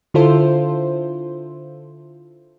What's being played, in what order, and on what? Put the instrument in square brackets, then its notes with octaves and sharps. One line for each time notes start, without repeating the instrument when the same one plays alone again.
[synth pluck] D3 E4 F4 A4 C5